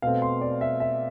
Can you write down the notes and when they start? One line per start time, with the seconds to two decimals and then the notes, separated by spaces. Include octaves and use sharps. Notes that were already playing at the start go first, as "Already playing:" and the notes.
0.02 B2 A3 C4 F5
0.22 C6
0.41 D5
0.61 E5
0.80 E5